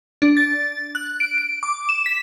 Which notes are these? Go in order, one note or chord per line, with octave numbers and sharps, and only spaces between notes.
D4
A6
F#6
D7
D7
D6
E7
B6